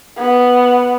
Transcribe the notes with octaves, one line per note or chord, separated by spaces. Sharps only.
B3